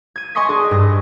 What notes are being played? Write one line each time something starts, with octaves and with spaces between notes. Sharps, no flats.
G#6 D#7
D#5 G#5 C6 C#6 D#6 B6
D4 G#4 D5
G2 A#6